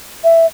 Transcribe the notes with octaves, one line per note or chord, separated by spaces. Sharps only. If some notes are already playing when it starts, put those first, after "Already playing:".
E5